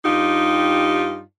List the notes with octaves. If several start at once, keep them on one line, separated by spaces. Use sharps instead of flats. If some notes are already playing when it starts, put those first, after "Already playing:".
G2 D#4 F4 G4